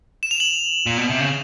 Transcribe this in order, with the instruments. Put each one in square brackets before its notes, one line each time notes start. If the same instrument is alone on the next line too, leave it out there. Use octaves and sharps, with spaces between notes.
[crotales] E7
F7
F#7
[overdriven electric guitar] A#2
B2
C3
C#3